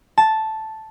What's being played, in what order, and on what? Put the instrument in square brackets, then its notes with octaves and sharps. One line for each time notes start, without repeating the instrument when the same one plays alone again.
[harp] A5